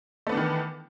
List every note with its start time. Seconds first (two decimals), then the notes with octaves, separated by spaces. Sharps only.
0.27 A3
0.29 B3
0.32 D4
0.35 E3
0.37 D#3